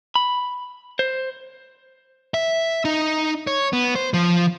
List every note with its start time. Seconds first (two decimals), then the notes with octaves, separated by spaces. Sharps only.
0.16 B5
0.99 C5
2.34 E5
2.85 D#4
3.47 C#5
3.73 B3
3.95 C5
4.14 F3